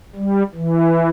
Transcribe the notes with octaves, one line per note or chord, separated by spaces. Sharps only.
G3
E3